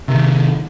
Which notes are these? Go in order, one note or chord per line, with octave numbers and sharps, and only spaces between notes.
C3 D#3